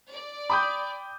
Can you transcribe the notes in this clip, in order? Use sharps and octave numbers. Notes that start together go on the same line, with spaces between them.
D5
G5 B5 D6 D#6 G6